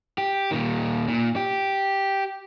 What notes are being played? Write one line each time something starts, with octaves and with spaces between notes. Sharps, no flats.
G4
A#2 D#3
A#2
G4